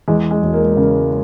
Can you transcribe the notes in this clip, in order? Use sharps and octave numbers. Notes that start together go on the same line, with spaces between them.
E2 G#3
G#3
E1
A#3
C#3 A#3